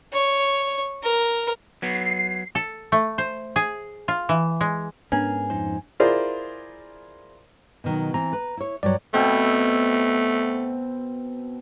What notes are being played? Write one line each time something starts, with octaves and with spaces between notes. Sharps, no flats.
C#5
A#4
F#3 B3 C7
A4
A3
C5
G#4
F4
E3
G#3
G#2 B3 C#4 D4 G#4 A#4
F2 D#4 C5
E4 F4 G#4 A#4 C5 D5
B2 D#3 F#3
E3 C4 A#5
B4
E4 C#5
G2 F#3 C#5 D5
B2 A3 C4